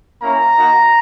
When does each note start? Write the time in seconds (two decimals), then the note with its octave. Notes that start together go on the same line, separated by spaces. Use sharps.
0.22 A#3 C#4 E4 A#5
0.57 A#3 D#4 F#4